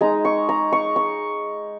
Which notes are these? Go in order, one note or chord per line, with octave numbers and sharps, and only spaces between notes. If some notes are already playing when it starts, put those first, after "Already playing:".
G#3 D#4 A#5
C#6
A#5
C#6
C#6